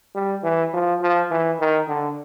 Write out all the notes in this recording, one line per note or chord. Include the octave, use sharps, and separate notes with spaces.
G3
E3
F3
F3
E3
D#3
D3